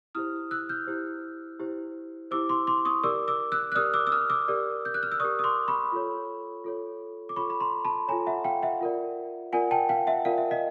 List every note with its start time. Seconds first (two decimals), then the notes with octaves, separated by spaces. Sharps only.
0.15 E4 G4 C5 D#6 F6
0.51 E6 F#6
0.69 F6 G6
0.87 E4 G4 C5
1.60 E4 G4 C5
2.31 E4 G4 C5 D6 E6
2.49 C6 D6
2.67 C6 D6
2.85 C#6 D#6
3.03 G4 A#4 D5 D6 E6
3.28 D6 E6
3.52 E6 F#6
3.72 F#6
3.75 G4 A#4 D5 D#6 F6
3.94 D6 E6
4.07 E6
4.12 D#6 F6
4.30 D6 E6
4.48 G4 A#4 D5
4.85 G6
4.94 F#6
5.03 F6
5.12 E6
5.20 G4 A#4 D5 C#6 D#6
5.39 D#6
5.44 C6 D6
5.68 B5 C#6
5.92 F4 A4 C#5
6.64 F4 A4 C#5
7.29 D6
7.36 F4 A4 C#5 B5 C#6
7.50 B5
7.60 A#5 C6
7.85 A5 B5
8.08 F4 A4 C#5 G#5 A#5
8.27 E5 F#5
8.44 F5 G5
8.63 E5 F#5
8.81 F4 A#4 D5
9.52 F4 A#4 D5 F#5 G#5
9.71 G5 A5
9.89 F5 G5
10.07 E5 F#5
10.25 F4 A#4 D5 F5
10.38 E5
10.51 D#5 F5